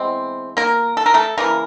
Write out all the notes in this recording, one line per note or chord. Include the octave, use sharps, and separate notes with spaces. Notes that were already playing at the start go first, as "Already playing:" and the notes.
Already playing: E3 G#3 B3 C4
A#3 A#4
A4
A#4
A3 A4
C#3 E3 A3 A#3 A#4